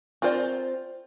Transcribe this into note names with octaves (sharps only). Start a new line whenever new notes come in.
C4 F4 A#4 C5 D5